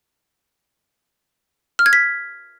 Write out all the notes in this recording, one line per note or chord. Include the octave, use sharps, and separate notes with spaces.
F6
G#6
B6